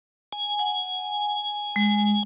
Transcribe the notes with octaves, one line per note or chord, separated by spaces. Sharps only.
G#5
F#5
G#3